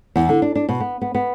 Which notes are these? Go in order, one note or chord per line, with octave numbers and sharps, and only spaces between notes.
E2
D3
D4
D4
B2
B3
B3
B3